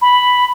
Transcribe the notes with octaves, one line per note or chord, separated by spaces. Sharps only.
B5